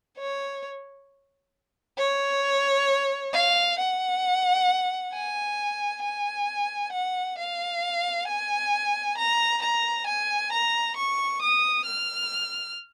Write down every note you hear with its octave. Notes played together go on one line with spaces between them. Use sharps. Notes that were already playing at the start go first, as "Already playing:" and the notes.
C#5
C#5
F5
F#5
G#5
G#5
F#5
F5
G#5
A#5
A#5
G#5
A#5
C#6
D#6
F6